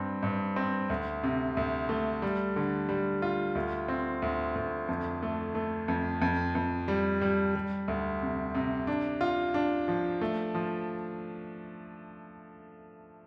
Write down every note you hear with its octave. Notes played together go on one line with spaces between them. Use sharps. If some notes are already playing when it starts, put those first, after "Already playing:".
Already playing: G2 C4
G2
C4
D2
C3
D2
A3
G3
D3
G3
F4
D2
C4
D2
D2
F2
A3
A3
F2
F2
F2
G3
G3
G3
D2
C3
C3
D4
F4
D4
F3
A3
F3